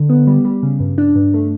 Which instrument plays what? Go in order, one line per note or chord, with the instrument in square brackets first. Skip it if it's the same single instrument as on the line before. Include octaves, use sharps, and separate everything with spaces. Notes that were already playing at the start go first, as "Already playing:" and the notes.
Already playing: [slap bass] D3
[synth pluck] B3
G3
G3
C#3
G2
D4
G2
A3